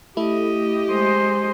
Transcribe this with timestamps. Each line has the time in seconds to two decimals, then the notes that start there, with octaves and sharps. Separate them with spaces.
0.17 A3 E4 G4 D#5
0.92 G#3 C5